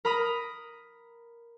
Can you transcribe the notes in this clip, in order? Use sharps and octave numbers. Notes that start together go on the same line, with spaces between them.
A#4 A#5 B5 D#6